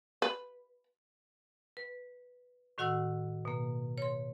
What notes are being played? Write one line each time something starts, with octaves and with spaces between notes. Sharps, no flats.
B4
B4
A2 D#3 F#4 F#5 E6
B2 A#3
C#5 C6